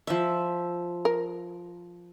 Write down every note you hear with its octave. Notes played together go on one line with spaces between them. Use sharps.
F3 E5
A#4